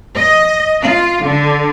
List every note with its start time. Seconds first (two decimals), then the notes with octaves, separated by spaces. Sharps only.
0.16 D#5
0.82 F4
1.23 D3